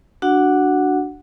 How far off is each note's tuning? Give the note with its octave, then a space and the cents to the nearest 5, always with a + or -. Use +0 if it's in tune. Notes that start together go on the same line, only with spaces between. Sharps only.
D4 +0 F#4 +0 F#5 +0